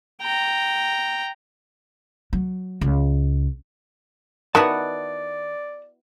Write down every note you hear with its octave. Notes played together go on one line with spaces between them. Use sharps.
G5 A#5
F#3
C#2
D#3 B3 E4 F#4 D5 F#5 A5